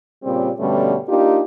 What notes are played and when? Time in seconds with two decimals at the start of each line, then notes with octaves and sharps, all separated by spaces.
0.24 A#2 C#3 G3 C4 G4
0.59 G2 B2 D3 G3 A3 C#4
1.08 A#3 D4 D#4 F4 G4